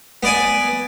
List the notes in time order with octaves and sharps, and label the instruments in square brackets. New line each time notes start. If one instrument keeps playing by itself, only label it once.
[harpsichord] B3 D5 G#5